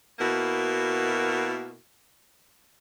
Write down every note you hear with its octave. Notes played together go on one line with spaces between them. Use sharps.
B2 A#3 E4 F#4 A#4